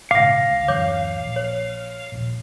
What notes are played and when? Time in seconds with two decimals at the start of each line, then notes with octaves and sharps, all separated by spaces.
0.11 A#1 G#2 C#3 F5 D6 A#6
0.50 D2
0.68 D1 F#2 E3 C#5 D6 G6
1.20 A#1
1.36 C#5
2.12 D#1 A#1